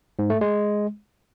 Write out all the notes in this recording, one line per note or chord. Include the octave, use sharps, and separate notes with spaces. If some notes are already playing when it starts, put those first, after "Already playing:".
G#2
A3
G#3